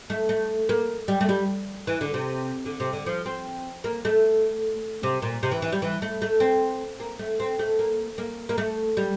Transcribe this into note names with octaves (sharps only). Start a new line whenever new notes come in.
A3
A3
A#3
G3
A3
G3
E3
D3
C3
D3
C3
D3
F3
C4
A#3
A3
C3
A#2
C3
E3
E3
G3
E3
A3
A3
C4
A#3
A3
C4
A3
A#3
A#3
A#3
A3
G3